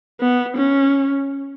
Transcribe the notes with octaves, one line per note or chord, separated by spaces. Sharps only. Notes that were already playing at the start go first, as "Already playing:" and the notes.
B3
C#4